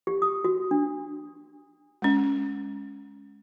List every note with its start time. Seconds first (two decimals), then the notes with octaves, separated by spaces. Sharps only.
0.07 G4
0.22 D#6
0.44 F#4
0.71 D4
2.02 G#3 C#4